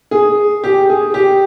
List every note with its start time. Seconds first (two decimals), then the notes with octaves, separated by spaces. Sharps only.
0.11 G#4
0.64 G4
0.89 G#4
1.14 G4